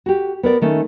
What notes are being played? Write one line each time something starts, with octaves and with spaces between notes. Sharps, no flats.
F#4 G4
B3 A#4 D5
D#3 A3 C#4